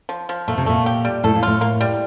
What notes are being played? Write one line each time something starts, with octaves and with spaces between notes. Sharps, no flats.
F3
F3
A#2 A3
C3
A#2 A3
G4
G3
A2 A4
A#2
A2 F4
A#3
G3